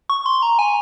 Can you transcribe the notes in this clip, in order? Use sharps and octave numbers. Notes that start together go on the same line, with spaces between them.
C#6
C6
A#5
G#5